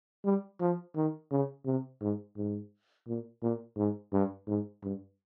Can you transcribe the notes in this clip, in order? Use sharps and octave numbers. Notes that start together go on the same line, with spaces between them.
G3
F3
D#3
C#3
C3
G#2
G#2
A#2
A#2
G#2
G2
G#2
G2